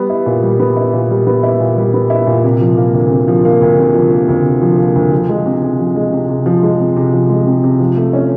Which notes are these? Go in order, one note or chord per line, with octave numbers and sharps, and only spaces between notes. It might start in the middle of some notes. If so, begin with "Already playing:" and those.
Already playing: G3 B3
E4
A#2
G3
B3
E4
A#2
G3
B3
E4
A#2
G3
B3
E4
A#2
C3
F3
A#3
D2
C3
F3
A#3
D2
C3
F3
A#3
D2
C3
F3
A#3
D2
F3
G#3
C3
C3
F3
G#3
C3
C3
F3
G#3
C3
C3
F3
G#3
C3
C3
F3
A3
C#4